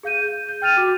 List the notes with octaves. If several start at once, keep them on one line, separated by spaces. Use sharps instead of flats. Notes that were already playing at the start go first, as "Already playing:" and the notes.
G#4 F5 G6 D#7
G6
G6
G5 F6 A6 D#7 F7
F#4 D6